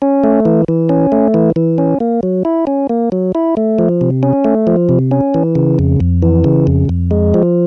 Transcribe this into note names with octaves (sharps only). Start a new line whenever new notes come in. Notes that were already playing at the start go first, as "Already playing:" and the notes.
C#4
A3
E3
E3
C#4
A3
E3
E3
C#4
A#3
F#3
E4
C#4
A#3
F#3
E4
A3
F3
C3
C#4
A3
F3
C3
C#4
E3
C#3
F2
F2
E3
C#3
F2
F2
G#3
F3